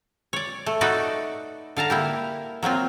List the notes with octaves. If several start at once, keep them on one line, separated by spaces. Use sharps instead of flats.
C#5 D5
A3
D#4 F#4 A4 B4 D5
D3 F5 A5 A#5
A#3 E4 G4
F#3 A#3 C4 F4